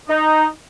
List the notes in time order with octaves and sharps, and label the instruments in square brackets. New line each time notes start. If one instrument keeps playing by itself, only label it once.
[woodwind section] D#4